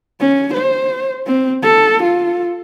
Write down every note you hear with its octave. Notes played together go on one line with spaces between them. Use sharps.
C#4
C5
C4
A4
F4